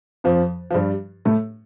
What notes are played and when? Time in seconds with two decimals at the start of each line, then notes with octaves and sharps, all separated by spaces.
0.24 F2 F3
0.71 F3
0.74 G2 G3
1.25 A2 A3